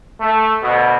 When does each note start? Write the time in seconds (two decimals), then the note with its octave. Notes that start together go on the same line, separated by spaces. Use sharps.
0.21 A3
0.62 D2 B2